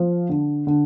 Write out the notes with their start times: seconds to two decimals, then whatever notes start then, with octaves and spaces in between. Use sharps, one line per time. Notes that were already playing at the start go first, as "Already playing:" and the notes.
Already playing: F3
0.29 D3
0.67 D3